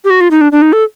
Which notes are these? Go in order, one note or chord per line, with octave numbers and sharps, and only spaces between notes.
G4
F#4
F4
D#4
D4
D4
D#4
A4